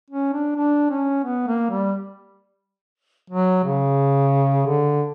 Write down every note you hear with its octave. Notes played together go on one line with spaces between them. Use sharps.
C#4
D4
D4
C#4
B3
A#3
G3
F#3
C#3
D3